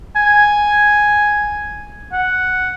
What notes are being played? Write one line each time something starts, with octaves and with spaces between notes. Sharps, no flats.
G#5
F#5